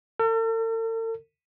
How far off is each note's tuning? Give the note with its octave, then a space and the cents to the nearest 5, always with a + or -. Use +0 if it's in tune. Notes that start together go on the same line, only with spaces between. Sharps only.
A4 +45